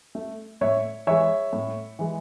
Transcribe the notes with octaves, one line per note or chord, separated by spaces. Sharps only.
A3
A2 C#5 E5
E3 G#3 C#5 E5
A2
E3 G#3